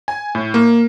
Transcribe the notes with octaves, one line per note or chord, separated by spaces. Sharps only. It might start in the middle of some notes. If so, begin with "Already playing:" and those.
G#5
A2
A#3